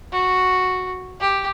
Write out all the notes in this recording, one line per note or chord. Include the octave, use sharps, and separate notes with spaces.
F#4
G4